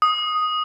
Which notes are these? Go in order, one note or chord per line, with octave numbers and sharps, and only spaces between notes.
D#6